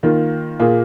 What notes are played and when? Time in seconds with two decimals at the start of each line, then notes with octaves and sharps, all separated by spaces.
0.03 D#3 A#3 F4
0.59 A#2 A#3 F4 G#4